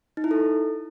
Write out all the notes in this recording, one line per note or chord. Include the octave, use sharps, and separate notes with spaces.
D#4
E4
A4